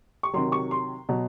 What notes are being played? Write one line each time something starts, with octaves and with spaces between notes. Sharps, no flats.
C#6
C3 D#3 F#3 C6
C#6
C6
B2 F#3